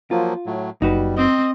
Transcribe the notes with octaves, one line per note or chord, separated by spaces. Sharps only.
F3 F#3 A#3 F4
A2 F#3
F#1 G3 D#4 F#4 B4
C4 D#5